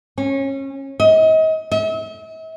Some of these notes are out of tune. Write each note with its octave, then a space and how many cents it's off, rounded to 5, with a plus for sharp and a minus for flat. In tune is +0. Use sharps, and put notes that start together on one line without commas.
C#4 -25
D#5 +35
E5 -45